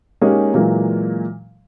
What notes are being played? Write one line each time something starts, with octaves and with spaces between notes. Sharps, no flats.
G#3 A#3 C#4 D#4 G4 G#4
A#2 E3 F#3 G#3 A#3